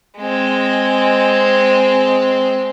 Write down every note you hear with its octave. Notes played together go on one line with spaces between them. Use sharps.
G#3 C4